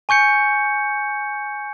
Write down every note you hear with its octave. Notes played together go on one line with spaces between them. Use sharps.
G#5 C#6 G6 C#7